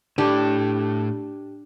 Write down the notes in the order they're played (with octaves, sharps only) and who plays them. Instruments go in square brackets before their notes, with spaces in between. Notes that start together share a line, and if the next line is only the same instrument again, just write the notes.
[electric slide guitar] A2 A4 [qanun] D4 G4